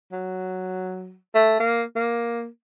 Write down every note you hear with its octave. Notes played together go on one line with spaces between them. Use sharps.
F#3
A3
A#3
A#3